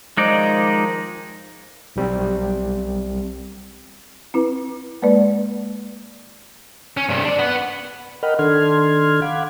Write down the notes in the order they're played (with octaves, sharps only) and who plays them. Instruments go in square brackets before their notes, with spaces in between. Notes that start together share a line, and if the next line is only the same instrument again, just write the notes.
[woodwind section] D#3 F3 [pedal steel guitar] G#3 D#4 D5
[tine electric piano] B1 G3 C4
[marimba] C4 E4 B4
G#3 A#3 B4 D5
[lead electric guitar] C#4
G2 C3
D4 D5
B4 F#5
[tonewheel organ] A#4 D#5 F#5 G5 B5 F6
D#3 D4 A4 C6 F6 G#6
F5 F#5 B5 D6 G#6